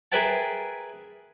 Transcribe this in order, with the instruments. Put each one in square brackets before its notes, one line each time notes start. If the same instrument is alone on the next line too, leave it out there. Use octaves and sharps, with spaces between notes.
[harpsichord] G#4 A#4 B4 E5 G5 A5